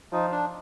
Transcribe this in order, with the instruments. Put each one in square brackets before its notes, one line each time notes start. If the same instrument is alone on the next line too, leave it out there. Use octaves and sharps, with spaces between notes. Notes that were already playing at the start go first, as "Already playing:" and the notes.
[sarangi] F3 [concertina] D#4
[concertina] D4